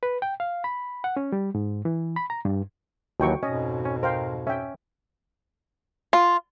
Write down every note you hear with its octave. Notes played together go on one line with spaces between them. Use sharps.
B4
G5
F5
B5
F#5
C#4
G3
G#2
E3
B5
A#5
G2
D#2 E3 F#3 F#4 G5 C#6
F2 G#2 B2 C#4 D#5
C#4
A#4 C5 F5 G5
C#4 E5 G5
F4